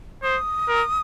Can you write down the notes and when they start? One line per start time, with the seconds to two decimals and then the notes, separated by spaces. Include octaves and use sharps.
0.23 C5 D#6
0.69 A#4